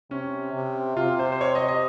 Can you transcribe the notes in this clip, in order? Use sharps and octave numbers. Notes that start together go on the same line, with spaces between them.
C3 C#4
C3
C3 F4
C5
C5
C#5
D#5
D#5